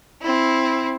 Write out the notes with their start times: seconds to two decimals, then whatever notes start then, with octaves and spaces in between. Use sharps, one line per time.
0.21 C4 E4